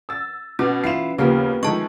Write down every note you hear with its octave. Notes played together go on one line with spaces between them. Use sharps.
E6 A6
B2 B3 C#4
E3 E4 F4 C7 E7
D#2 C#3 F3 A#3 B3 G4
D#3 F3 G#3 A3 A5 C#6